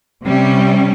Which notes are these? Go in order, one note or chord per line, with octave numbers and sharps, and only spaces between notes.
C3 G3 C#4